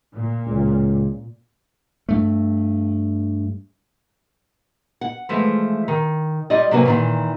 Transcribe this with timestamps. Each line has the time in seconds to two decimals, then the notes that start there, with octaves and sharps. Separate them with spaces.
0.15 A#2
0.47 C#2
2.09 G2 A3
5.01 F#5
5.29 E3 F3 G#3 A3
5.88 D#3
6.50 G3 F4 D5 D#5
6.71 C3 F#3 A#3 F#4 B4 G#5
6.86 A#2 D#3 E3